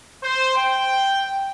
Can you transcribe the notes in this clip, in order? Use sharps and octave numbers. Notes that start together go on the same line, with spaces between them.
C5
G5